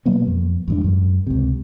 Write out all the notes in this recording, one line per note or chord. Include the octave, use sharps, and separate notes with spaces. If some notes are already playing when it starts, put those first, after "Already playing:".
B2 F#3 A#3 B3
F2
E2 G#2 D4
F#2
C#2 C3